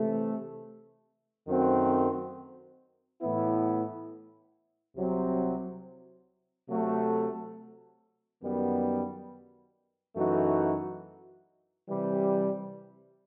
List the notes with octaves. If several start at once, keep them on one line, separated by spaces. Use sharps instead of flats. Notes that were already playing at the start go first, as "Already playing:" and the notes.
Already playing: C3 E3 A3
F#2 D#3 A3 C4 F#4
A2 E3 B3 E4
C2 C3 F#3 C4
C3 F#3 A3
F#2 D#3 G3 B3
F#2 E3 A3 D#4 F#4
C3 E3 G3